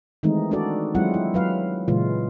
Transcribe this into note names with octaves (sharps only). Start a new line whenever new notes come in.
D#3 E3 G#3 A3 C4 D#4
D4 D#4 F#4 A4 D5
F#3 G#3 C4 E4 F4 F#5
E4
F#3 B4 F5
A#2 C#3 E3 G#3 F4